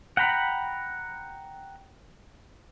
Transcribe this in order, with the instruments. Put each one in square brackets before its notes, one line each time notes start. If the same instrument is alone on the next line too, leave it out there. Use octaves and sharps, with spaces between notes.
[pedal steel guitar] F#5 G5 A#5 B5